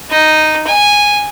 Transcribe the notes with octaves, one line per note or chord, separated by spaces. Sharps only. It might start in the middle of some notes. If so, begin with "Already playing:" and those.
D#4
G#5